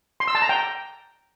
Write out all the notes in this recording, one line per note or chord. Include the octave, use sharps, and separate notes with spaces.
C6
E6
A5
A#5
G5